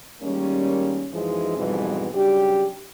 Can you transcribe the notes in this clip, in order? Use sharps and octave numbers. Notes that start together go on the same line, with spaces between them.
D#3 G3 G#3 A#3 C#4
F#2 E3 F3 G#3 D#4 G#4
F2 G#2 B2 E3 G3 B3
C#3 F#3 G3 D4 G4